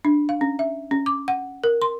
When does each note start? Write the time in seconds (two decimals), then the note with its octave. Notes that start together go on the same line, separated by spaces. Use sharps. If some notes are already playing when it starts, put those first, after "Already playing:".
0.05 D4
0.29 F5
0.41 C#4
0.59 E5
0.91 C#4
1.06 D6
1.28 F#5
1.64 A#4
1.82 C6